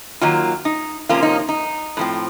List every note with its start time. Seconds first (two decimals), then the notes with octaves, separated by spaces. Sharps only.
0.21 D#3 F#3 A#3 F4
0.65 D#4
1.09 C3 F3 A#3 C#4 F4
1.23 D#4
1.49 D#4
1.97 A2 F3 C4